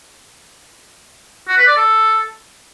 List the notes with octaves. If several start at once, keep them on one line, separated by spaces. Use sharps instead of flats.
F#4
B4
D5
A4